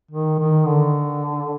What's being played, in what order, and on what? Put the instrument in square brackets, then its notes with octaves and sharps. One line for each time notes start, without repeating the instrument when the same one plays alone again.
[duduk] D#3
D#3
D3